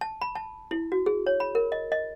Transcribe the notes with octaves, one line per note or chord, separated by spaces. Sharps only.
A5
B5
A5
E4
F#4
G#4
C#5
B5
A#4
D#5
D#5